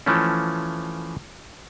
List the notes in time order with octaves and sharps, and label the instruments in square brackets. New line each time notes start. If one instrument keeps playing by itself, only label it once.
[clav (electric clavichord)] E3 F3 A3 C#4